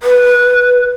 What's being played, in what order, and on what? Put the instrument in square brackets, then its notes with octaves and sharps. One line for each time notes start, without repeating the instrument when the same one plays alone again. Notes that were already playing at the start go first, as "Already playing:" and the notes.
[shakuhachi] B4